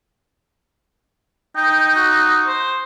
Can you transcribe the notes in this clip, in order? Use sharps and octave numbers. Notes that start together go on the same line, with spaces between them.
D#4 G5
F#4
C5